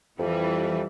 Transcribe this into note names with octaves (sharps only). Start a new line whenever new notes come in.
F2 E3 G3 B4